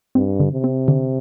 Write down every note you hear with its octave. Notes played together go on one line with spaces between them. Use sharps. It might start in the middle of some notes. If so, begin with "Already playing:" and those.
G2 C4
D3
C3
C4
D3